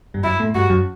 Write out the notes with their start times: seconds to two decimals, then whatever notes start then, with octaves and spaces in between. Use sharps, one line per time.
0.14 G2 G3
0.24 F#2 F#3 E4
0.40 A2 A3
0.54 G2 G3 F#4
0.70 F#2 F#3